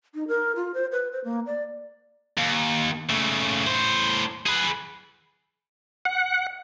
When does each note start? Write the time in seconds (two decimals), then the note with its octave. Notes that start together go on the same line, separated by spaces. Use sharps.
0.14 D#4
0.28 A#4
0.56 F4
0.74 C5
0.92 B4
1.12 C5
1.24 A#3
1.46 D5
2.38 D#2
3.10 C#3 A3
3.67 A2 C5
4.46 G#4 B4
6.05 F#5